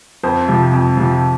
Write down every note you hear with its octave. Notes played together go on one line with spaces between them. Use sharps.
F2 C5
C3 F3
F2
C3 F3